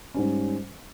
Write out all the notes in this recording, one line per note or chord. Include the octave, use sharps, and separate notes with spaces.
G#2 G3 C#4